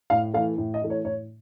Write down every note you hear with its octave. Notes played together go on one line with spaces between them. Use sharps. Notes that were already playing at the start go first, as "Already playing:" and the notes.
A2 F5
E3 A3 F5
A2
D#5
E3 A3
C#5
A2 C#5